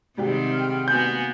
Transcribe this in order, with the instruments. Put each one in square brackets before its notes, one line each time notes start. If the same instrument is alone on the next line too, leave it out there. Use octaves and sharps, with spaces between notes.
[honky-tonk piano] G#2 G3 G4 [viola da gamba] C3 D#3 C4
[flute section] G5 F6
[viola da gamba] A#3 B3 F#4 [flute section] G#5 [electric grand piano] G6